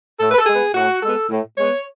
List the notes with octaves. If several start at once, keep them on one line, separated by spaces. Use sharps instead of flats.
A2 A4
B4
A4
G#3 B3 G#4
A2 F#4
G#3 B3 A4
A2
G#3 B3 C#5